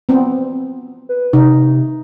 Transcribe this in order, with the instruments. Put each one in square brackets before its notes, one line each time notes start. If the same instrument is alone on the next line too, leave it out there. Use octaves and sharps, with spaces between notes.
[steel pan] B3 C4
[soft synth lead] B4
[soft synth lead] C3 [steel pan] D#4